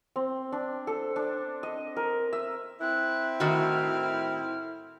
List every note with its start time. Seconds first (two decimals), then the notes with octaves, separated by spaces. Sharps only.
0.16 C4
0.52 D4
0.87 A4
1.16 D4
1.63 D#5
1.96 A#4
2.33 E5
2.81 C4 E4 F#6
3.40 A2 D#3 F#4 F6